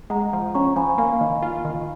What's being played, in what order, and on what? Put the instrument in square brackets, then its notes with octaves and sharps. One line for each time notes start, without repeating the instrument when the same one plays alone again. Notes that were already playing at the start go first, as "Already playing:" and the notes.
[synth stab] G#3 [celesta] F#5 A#5
[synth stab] F3
[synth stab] C#4 [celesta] A#5 C#6
[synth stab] F3 [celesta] G#5 B5
[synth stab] A#3 [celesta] F5 G#5
[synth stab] D#3
F4
D#3